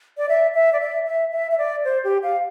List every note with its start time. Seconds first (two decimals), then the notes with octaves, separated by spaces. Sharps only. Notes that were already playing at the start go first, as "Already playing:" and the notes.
0.18 D5
0.29 E5
0.54 E5
0.73 D5
0.80 E5
1.06 E5
1.32 E5
1.51 E5
1.58 D5
1.85 C5
2.04 G4
2.23 F5